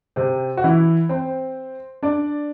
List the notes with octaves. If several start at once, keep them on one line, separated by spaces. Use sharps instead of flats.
C3 C4
F#4
E3 E4
C4 C5
D4 D5